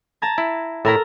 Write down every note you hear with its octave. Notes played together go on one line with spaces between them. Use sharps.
A5 A#5 G#6
E4
A2 E4 A4 A#4 A#5